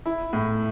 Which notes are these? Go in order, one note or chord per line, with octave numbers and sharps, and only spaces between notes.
E4
A2